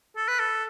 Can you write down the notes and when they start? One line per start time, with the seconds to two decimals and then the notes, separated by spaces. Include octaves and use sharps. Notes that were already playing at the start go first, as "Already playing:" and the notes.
0.17 A4
0.28 B4
0.40 A4